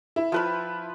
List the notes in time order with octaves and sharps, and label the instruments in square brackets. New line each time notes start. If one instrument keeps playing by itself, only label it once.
[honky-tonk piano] E4
[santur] F3 B4 B5